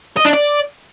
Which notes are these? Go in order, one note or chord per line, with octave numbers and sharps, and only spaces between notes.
D#5
D4
D5